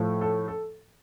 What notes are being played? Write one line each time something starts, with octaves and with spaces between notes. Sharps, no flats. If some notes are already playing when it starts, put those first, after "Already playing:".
Already playing: A2 F3 A3
A4
A4